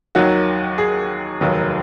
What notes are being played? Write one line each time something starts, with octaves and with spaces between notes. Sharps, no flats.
D#2 D#3 F#3 F#4
G#4
F1 D#2 D#3 F#3